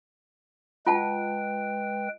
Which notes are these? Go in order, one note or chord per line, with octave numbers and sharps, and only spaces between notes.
G#3 F4 B4 F#5 G5 A5